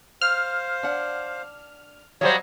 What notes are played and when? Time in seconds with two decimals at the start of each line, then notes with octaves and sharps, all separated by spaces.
0.21 C5 F5 F6
0.83 D4 F#5
2.21 F#3 G3 C5 C#5 D#5 F5 A#5